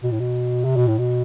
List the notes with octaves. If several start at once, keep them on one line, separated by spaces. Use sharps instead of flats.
B2
A2
B2
C3
B2
A2
B2